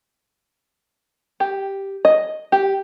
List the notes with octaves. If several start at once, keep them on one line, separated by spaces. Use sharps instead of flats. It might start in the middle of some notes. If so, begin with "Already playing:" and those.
G4
D#5
G4